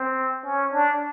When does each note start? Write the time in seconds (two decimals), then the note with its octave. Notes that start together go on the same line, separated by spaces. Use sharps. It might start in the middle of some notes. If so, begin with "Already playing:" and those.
Already playing: C4
0.46 C#4
0.73 D4